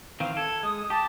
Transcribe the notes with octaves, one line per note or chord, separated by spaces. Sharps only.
D#3 E3 C4 F5
A4 G#6
G#3 D#6
G4 A5